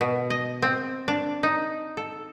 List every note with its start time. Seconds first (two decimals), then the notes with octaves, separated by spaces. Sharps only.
0.01 B2
0.30 D#5
0.62 C4
1.08 D4
1.43 D#4
1.97 A4